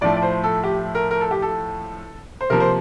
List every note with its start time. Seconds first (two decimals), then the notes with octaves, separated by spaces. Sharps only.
0.01 A2 F3 A3 D5
0.16 D5
0.22 C5
0.43 A4
0.64 G4
0.95 A#4
1.11 A#4
1.21 A4
1.31 G4
1.42 A4
2.41 C5
2.50 C3 F3 A#3 A#4
2.60 C5